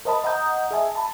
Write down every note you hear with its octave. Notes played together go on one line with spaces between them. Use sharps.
A#4 C5 D#5 A5 B5
D#5 F#5 A#5 D#6 G6
G#4 D#5 E5 G#5 A5
A5 B5